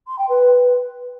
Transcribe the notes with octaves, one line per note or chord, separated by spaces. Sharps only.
C6
G5
B4